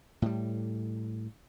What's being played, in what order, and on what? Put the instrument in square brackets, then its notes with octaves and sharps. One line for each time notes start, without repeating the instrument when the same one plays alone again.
[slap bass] A2 G3